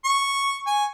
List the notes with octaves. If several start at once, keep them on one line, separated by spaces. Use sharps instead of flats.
C#6
G#5